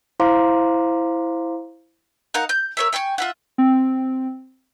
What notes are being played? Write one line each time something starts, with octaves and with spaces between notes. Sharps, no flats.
E4 C5 F5 A#5 C6 D6
D#4 A#4 F5 F#5
G6
A#4 C#5 E5
E5 G5 G#5 C#6
F4 E5 F#5
C4